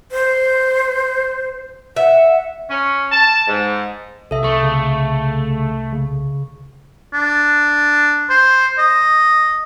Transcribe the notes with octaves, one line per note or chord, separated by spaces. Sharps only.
C5
E5 F#5
C#4
A5
G#2
C2 A4 E5
A3 C#6
C#3
C#3
D4
C5
D#5